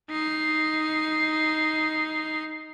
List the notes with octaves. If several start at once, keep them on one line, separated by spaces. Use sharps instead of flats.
D#4 C7